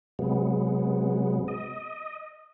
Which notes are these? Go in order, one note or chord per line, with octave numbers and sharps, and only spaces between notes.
C3 F#3 G#3 B3
D#5